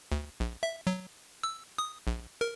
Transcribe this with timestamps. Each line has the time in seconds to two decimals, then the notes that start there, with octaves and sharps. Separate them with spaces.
0.12 D2
0.40 A#1
0.63 E5
0.87 F#3
1.43 E6
1.78 D#6
2.07 A#1
2.41 A#4